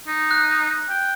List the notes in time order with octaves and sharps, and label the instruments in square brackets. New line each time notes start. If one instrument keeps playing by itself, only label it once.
[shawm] D#4
[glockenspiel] F#6
[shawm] G5